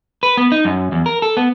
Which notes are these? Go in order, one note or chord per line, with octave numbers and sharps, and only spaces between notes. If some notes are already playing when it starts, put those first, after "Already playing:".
B4
B3
D#4
F#2
E2
A#4
A4
B3